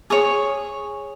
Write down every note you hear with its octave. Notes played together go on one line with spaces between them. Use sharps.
G#4 C#5 D#6